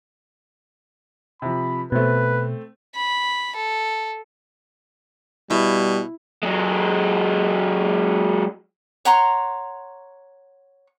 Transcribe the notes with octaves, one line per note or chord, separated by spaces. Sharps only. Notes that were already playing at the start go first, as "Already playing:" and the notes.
C3 F3 B5
B2 A3 C4 B4 C5
B5
A4
B2 G3 E4
F#3 G#3
C#5 F#5 A#5 C6